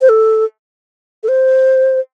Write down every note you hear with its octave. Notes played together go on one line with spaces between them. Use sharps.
C5
A4
A4
C5